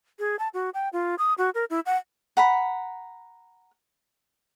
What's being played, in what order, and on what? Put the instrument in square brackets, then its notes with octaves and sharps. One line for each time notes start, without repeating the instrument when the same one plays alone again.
[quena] G#4
A5
F#4
G5
F4
D#6
F#4
A#4
E4
F#5
[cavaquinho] F#5 A#5 B5